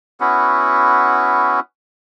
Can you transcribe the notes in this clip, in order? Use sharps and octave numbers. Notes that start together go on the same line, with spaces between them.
B3 C#4 E4 F#4